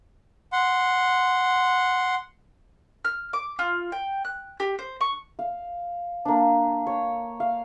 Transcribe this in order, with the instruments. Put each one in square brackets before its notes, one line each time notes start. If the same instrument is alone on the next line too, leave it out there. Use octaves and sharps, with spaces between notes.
[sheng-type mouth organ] F#5 C6
[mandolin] F6
D6
F4
G5
F#6
G4
C5
C#6
[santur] F5
A#3 D4
C#5
F5